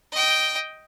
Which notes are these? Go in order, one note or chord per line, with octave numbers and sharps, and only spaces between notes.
D#5 G5